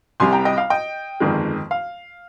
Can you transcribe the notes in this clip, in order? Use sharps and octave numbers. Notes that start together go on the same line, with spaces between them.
C2 C3 G3 G#5 C6
G5 A#5
D#5 G5
F5
D#5 G5
G1 F2 D#3 G#3
F5